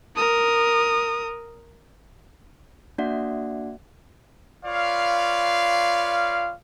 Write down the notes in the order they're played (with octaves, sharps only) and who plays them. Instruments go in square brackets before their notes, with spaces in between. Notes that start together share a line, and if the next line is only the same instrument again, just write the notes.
[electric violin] A#4 D#6
[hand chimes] A#3 D4 F#4 D5 E5 F#5
[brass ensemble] F4 B4 C#5 D5 F5